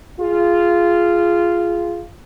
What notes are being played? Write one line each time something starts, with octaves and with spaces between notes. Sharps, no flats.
F4 G#4